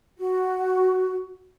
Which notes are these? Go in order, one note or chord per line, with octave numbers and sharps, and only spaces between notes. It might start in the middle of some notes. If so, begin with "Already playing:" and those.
F#4